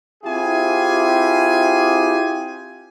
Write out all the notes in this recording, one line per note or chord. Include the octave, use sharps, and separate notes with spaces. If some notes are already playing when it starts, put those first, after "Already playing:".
C4 E4 F4 G4 G#4 G#5